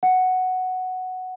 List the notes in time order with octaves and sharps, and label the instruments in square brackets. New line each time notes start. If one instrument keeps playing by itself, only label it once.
[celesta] F#5